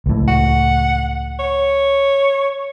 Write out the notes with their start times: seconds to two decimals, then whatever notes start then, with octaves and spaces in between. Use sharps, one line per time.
0.06 C#2 A2
0.28 F#5
1.39 C#5